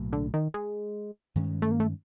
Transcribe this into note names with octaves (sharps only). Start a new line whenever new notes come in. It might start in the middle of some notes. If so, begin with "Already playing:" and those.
Already playing: B1 A2 F#3 A#3
D3
D#3
G#3
G2 D#3 G#3 C#4
A3
A#3
A3